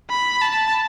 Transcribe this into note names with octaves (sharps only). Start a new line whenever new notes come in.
B5
A5